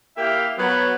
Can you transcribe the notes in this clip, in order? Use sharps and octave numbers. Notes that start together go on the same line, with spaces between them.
A#3 E4 G4 E5 F5 G5
F#3 B3